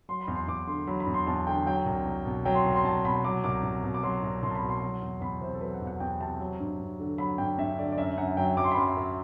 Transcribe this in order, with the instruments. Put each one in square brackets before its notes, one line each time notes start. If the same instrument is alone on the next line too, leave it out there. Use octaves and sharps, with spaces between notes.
[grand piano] F#3 C6
B5
E2
C6
E2 D6
D3 C6
F#3 B5
B5
E2
C6
E2 A5
D3 G5
F#3 G5
C2
C2
B2
F#3 G5
C6
C2
C6
C2 A5
B2 B5
F#3 D6
C2 D6
C2
B2
D6
F#3 C6
C2
C2 C6
A5
B5
B2
C6
F#3
E2
E2 B5
C3 C5
A4
F#3 B4
F#5
E2
F#5
E2 G5
C3 A5
F#3
G2
G2
D3
F#3 B5
G2 G5
G2 E5
D3 D5
D5
F#2 E5
F#2 F#5
F#3 G5
F#3 D6
C6
B5
F#2 C6
F#2